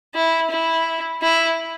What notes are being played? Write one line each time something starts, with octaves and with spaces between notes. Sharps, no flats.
E4
E4
E4